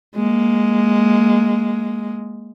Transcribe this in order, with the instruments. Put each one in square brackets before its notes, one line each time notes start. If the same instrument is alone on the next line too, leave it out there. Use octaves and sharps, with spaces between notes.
[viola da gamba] G#3 A#3